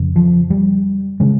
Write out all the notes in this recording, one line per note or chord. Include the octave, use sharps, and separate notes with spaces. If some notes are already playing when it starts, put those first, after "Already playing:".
Already playing: F2 C#3
F3
G3
C#3 G#3